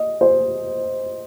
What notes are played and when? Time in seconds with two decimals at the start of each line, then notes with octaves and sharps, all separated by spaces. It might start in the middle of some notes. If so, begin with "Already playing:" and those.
Already playing: D#5
0.21 C5